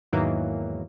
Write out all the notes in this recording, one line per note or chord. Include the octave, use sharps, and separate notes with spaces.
E2 G#2 D#3 E3 F#3 A#3